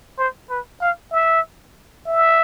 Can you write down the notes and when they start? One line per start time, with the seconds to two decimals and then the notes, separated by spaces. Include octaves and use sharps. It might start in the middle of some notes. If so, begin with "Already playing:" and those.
0.18 C5
0.50 B4
0.81 F5
1.12 E5
2.06 E5